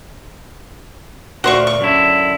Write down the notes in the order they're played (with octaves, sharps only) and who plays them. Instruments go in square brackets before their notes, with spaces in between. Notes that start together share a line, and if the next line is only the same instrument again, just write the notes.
[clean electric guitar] D2 A#2 [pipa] F#4 C5 C#6
[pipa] C#6
[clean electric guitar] F#2 D3 E4